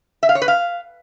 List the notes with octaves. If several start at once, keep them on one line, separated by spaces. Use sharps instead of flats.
E5
F5
C#5
B4
F5